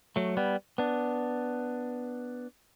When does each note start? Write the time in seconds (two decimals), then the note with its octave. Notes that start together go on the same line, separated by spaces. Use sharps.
0.16 F#3 A3
0.37 G3 B3
0.78 B3 D4